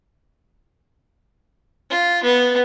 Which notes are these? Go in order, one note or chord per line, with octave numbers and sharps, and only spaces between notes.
F4
B3